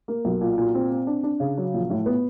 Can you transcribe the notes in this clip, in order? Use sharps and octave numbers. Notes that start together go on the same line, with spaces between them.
A#3
B1
A#2
A#2
C4
C4
D4
D4
C#3
F#3
A#1
A2
B3